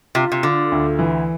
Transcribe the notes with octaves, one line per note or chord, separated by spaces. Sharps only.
C3 F4
C3
D3 F4
D2
E3